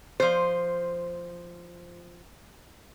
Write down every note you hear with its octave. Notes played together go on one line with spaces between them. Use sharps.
F3 C5